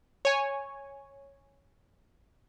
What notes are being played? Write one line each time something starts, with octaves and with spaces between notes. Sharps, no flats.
C#5 G#5